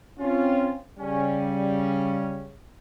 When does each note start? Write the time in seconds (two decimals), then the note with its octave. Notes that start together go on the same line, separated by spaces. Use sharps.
0.19 C4 C#4 F4
0.99 C#3 G3 C#4